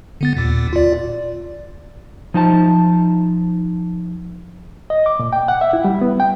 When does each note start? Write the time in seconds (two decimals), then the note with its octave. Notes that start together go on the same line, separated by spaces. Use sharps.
0.21 D3 B3 A6
0.36 D#2 A#2
0.73 F4 D5
2.34 F3 D#4 C5 A5
4.90 D#5
5.06 D6
5.19 A#2
5.33 G5
5.48 F#5
5.61 E5
5.73 E4
5.84 G3
6.01 B3
6.20 G5